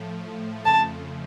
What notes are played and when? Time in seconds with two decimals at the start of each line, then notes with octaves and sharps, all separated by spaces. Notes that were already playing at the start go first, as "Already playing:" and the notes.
Already playing: A2 F3 A3
0.65 F2 C#3 F3 A3 A5